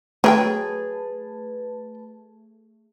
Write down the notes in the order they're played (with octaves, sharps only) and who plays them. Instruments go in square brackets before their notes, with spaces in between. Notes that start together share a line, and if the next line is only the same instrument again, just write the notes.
[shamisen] F#3 A#4 G5 [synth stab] A3 [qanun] G#4 [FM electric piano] B4 A5